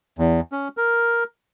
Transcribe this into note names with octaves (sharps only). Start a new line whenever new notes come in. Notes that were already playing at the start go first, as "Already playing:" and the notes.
E2
C#4
A#4